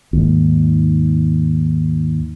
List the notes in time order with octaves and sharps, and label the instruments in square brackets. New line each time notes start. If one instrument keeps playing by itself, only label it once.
[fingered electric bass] D#2 G#2